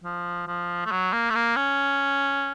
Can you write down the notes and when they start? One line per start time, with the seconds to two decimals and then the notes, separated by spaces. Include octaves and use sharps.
0.04 F3
0.47 F3
0.86 A3
0.91 F#3
1.13 A#3
1.30 A3
1.35 A#3
1.56 C#4